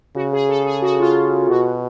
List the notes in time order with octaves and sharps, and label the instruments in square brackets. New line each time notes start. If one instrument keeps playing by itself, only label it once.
[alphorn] C#3 [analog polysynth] F#4
[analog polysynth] G#4
A4
G#4
F#4
F4
[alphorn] B2 [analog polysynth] F#4